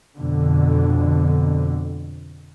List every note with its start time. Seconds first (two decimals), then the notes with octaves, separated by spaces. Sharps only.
0.18 F2 B2 D3